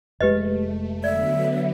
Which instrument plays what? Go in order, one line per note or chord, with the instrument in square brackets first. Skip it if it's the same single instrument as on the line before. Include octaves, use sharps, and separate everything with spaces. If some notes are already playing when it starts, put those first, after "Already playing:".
[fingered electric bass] F1 G#3 [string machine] A3 [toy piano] G4 B4 D#5
[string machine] D3 F#3 B3 [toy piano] D5 [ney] E5